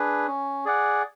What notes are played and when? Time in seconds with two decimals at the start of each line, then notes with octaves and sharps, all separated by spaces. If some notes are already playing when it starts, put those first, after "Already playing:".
Already playing: D4 G#4 B4
0.27 C#4
0.65 G#4 D5 F#5